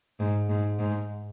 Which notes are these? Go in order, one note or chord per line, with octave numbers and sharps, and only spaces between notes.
G#2
G#2
G#2